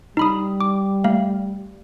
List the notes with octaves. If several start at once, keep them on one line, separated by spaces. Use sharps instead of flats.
G3 D#4 B5 D#6
D6
A3 F5